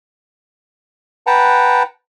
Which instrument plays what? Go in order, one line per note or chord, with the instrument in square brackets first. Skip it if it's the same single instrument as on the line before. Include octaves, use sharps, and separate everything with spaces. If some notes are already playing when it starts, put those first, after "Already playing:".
[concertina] B4 F#5 G5 A5 A#5